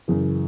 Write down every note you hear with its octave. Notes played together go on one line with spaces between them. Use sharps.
F#2 C#3 E3